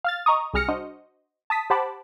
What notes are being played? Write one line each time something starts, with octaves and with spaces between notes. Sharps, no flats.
F5 F6 A6
D#5 A#5 C#6 D#6
C2 G3 G#4 F6 A#6 C#7
D4 F#4 C5 D#5
A5 D#6 B6
G4 C5 F#5 A5 B5 D6